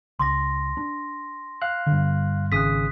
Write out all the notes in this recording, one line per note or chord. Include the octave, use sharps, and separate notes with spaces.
C#2 C6 D6 A#6
D4
F5 F#6
G2 D3
G#1 C#3 D#6 F#6 B6